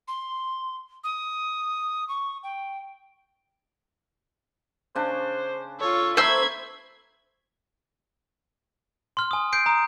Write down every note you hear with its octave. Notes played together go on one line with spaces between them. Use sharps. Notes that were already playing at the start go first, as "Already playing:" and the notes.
C6
D#6
C#6
G5
C#3 D4 C5
F4 A4 C#5
A3 C5 E5 A#5 B5 E6 G#6
C6 F6
G#5 D#6
G6 C7 D7
A#5 D#6